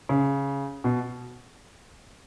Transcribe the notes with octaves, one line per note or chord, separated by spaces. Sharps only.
C#3
B2